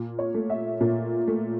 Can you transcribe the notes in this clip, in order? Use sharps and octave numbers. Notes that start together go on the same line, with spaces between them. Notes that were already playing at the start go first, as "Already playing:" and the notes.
Already playing: A#2
C#5
A3
E5
A#2
A3